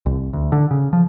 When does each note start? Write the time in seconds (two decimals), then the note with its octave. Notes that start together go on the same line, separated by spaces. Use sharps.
0.06 C2
0.33 D2
0.52 D3
0.71 C#3
0.93 F3